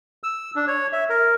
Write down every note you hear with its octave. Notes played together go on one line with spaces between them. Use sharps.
E6
D4
C#5
E5
A#4